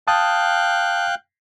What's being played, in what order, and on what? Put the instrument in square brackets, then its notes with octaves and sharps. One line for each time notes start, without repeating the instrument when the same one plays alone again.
[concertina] F5 G5 F#6 [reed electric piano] A5 D#6